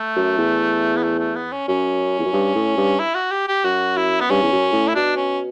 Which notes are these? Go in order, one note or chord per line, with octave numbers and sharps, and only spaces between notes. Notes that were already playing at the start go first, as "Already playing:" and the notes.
Already playing: A3
F#2
E2
B3
A3
A3
B3
C#4
F#2 C#4
E2
F#2
G2
A2
G2
E4
F#4
G4
G4
F#2 F#4
E4
B3
G2 C#4
E2
F#2
A2
E4
B2 D4
C#4